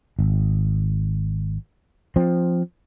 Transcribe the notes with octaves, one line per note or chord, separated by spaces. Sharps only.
G#1
F3 C4